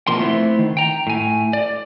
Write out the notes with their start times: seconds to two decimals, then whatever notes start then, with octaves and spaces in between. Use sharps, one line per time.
0.07 B2 F3 A#3 C6
0.20 A3 B3 C4 E4
0.59 D#3
0.77 G5 A#5
1.07 A2 G#5
1.53 D5